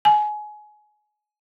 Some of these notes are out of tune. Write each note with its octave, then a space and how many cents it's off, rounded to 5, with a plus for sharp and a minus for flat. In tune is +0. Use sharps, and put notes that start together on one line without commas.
G#5 +25